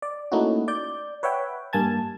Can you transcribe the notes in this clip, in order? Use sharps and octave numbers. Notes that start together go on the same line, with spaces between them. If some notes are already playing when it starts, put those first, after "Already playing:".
D5
A3 A#3 C#4 D#4 E4 F#4
D5 G6
B4 C#5 E5 F#5 G5
G2 A#3 G#5 A5 G#6